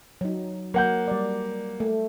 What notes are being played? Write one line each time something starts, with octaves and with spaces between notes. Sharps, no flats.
F#3 D#4
F#3 A#3 F#5 G6
G3 D5
A3